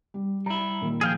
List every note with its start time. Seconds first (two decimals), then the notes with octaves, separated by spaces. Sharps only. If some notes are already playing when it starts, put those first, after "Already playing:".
0.14 G3
0.46 G3 E4 A#5
0.81 A#2 D#3
1.01 F3 G#4 F5 G5